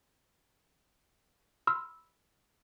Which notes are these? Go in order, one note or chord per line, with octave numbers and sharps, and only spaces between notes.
B5 C6 E6 F6